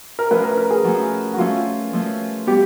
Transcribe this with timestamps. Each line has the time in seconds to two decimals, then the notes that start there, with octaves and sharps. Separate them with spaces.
0.19 A#4
0.30 F3 A3 C#4 B4
0.44 A#4
0.57 A#4
0.71 G#4
0.84 F3 A3 C#4 F#4
1.34 F#4
1.38 F3 A3 C#4 F4
1.93 F3 A3 C#4
2.47 G3 B3 G4